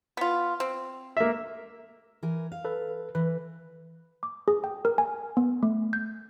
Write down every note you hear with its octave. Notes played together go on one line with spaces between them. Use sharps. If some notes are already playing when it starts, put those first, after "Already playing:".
B3 F4
C4
A#3 E5
E3 A#4 G#5
F5
A4 B4
E3 B4
D6
G#4
G5
A#4
G#5
B3
A3
G6